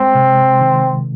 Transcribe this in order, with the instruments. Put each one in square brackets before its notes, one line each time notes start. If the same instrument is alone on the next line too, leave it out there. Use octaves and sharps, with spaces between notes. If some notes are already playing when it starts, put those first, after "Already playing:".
Already playing: [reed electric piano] G#3 [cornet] C4
[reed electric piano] C3
D#3